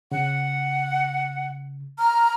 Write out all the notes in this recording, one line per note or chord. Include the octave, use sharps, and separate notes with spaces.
C#3 F#5
A#5 F6